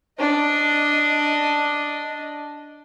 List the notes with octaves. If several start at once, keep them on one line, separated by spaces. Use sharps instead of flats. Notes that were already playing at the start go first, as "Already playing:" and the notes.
D4 D#5